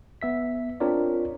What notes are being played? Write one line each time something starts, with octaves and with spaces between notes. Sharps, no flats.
B3 E5 B6
C4 D4 F4 A#4 C#5 D5